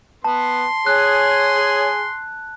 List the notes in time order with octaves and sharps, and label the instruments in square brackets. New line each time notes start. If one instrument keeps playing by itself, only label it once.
[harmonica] B3 [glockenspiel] A5 [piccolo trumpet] C6
[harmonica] G#4 G#5 [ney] C#5 [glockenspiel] F#6